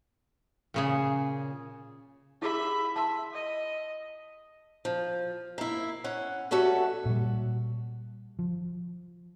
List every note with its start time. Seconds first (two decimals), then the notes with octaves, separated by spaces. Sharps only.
0.74 A#2 C#3 G#4
2.42 E4 G4 G#4 E5 B5
2.96 E5 A5 C6
3.34 D#5
4.85 F3
5.58 A#3 E4
6.04 C#4 F#5
6.51 G3 C#4 F#4 A4 E5 F#5
7.06 A#2 G3
8.39 F3